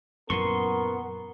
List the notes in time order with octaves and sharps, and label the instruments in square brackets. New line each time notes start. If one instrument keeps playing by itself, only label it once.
[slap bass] F#2 A#2 E3 [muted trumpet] B3 [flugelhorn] A#4 [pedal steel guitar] C6 C#6